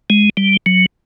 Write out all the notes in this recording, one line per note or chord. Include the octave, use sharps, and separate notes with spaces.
G#3
G3
F#3